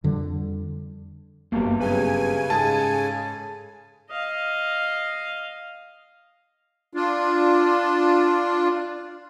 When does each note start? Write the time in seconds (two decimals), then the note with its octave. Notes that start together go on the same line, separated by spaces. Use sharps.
0.04 F2 D3 G3
1.52 G1 F#2 B2 A#3 G4
1.80 C#3 G4 B4 G#5
2.50 G#2 G#4 A4 A5
4.11 D#5 F5
6.94 D4 F4